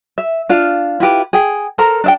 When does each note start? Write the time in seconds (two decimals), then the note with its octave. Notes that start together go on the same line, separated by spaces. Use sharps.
0.18 E5
0.49 D4 F4 F5
1.00 E4 F4 G4 B4
1.33 G#4 G5
1.78 A4 A#4 C5 A#5
2.04 D4 E5 G5